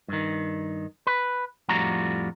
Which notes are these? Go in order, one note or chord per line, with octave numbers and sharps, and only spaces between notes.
G2 D#3
B4
F2 A2 G3 F4 F#4 A#5